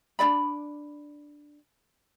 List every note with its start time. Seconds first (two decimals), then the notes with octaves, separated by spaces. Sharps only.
0.19 D4 D#4 D5 B5